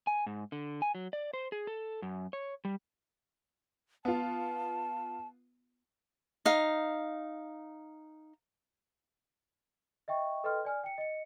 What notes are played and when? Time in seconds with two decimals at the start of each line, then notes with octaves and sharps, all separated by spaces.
0.07 G#5
0.26 G#2
0.52 D3
0.82 G#5
0.95 F#3
1.13 D5
1.34 C5
1.52 G#4
1.67 A4
2.02 F#2
2.33 C#5
2.65 G3
4.05 B3 F4 A5
6.45 D#4 F5
10.08 D#5 E5 G5 C#6
10.44 A4 B4 D#5 G5 C6 F6
10.65 D5 G#5 F6
10.83 G5 C#7
10.98 D#5 C#7